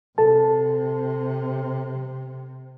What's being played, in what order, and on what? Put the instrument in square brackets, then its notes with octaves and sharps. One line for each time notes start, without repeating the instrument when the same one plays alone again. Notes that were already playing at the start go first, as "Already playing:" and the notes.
[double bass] C3 [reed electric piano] A4 A5